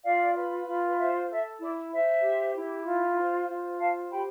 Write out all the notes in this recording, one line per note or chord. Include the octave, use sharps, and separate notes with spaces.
F4 D5 F5
B4
F4
C5 E5
A4 E5
E4 D5
C5 E5
G4
E4
F4
C5
F4
C5 F5 A5
G4 G5 B5